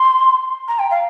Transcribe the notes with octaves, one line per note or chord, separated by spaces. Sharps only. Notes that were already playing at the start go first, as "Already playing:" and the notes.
Already playing: C6
A#5
G5
F5